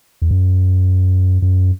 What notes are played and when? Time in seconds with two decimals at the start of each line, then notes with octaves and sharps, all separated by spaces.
0.22 E2
0.31 F#2
1.42 F#2